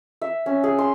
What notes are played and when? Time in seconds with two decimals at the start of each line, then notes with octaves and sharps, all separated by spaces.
0.22 E5
0.46 C#4
0.64 G#4
0.78 C6